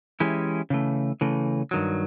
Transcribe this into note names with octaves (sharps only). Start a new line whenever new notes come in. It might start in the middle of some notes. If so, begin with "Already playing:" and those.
E3 G#3 C#4 E4 G4
C#3 E3 A3
C#3 E3 A3
G2 D#3 F#3